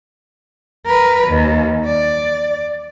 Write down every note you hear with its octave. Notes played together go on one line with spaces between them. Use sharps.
A#4 B4
D#2
D5